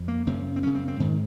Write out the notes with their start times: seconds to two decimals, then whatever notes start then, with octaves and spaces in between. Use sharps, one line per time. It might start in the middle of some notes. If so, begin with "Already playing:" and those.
Already playing: F2
0.08 A#3
0.27 F#2 C#3 C4
0.56 C4
0.63 F#2 C#3 C#4
0.75 C4
0.88 C4
1.00 G#2 D#3